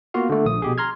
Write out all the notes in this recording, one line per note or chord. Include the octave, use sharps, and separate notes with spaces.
A#3 B3 F4 F#4 F5
D3 A3
A#1 D#6
B2 G4 G#4
A#5 C6 F6 G#6